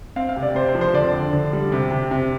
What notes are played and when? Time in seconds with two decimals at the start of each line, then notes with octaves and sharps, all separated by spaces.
0.16 C4 F5
0.29 F5
0.36 C3
0.43 D5
0.55 C3 C5
0.69 C5
0.75 F3
0.81 C5
0.94 D3 D5
1.14 D3
1.33 D3
1.53 G3
1.72 C3
1.91 C3
2.11 C3